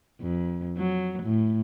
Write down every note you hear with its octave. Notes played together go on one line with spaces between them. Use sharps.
F2
F#3
A2